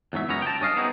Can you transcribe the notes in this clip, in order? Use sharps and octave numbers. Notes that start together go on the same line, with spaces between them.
E2 G#2 F#3 E5
C#2 F#2 B3 C#4 A#5
G5 A5
G2 C#4 D#5 F5
B3 C4 D#4 E4 F#4 G#4